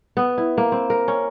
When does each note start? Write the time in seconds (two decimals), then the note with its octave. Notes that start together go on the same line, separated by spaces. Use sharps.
0.17 B3
0.38 E4
0.58 A#3
0.72 C4
0.90 A#4
1.08 C#4